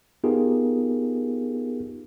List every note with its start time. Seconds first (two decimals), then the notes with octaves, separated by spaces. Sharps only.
0.24 B3 D#4 F4 G4 G#4 A#4